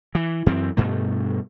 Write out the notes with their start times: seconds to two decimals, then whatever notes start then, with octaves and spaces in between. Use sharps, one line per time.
0.15 E3
0.46 F#2 E3 C4
0.77 G2 B2 A3